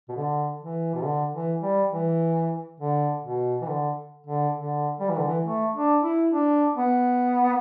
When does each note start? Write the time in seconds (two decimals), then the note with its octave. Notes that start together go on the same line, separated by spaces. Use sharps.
0.09 B2
0.16 D3
0.59 E3
0.95 B2
1.04 D3
1.33 E3
1.62 G3
1.92 E3
2.80 D3
3.24 B2
3.61 E3
3.69 D3
4.26 D3
4.57 D3
5.00 G3
5.09 E3
5.18 D3
5.27 E3
5.45 A3
5.74 D4
6.03 E4
6.33 D4
6.77 B3